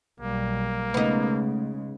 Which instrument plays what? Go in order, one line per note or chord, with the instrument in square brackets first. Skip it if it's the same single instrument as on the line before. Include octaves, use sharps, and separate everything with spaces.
[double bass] B1 G3 [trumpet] A#3
[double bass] C#3 G#3 [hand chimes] A3 [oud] B3 D#4